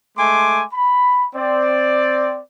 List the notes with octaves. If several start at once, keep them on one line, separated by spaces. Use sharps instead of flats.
G#3 A3 G#5 C6 D6
B5
C4 D5